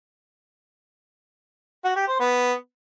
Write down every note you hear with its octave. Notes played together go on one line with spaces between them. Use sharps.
F#4
G4
C5
B3